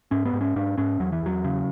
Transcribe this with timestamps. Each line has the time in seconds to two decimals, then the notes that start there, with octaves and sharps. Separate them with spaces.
0.11 G#2 C#4
0.25 B3
0.33 G#2
0.41 C#4
0.56 G#2 D4
0.78 G#2 C#4
0.99 E2 F#3
1.12 E3
1.22 E2 F#3
1.44 C#3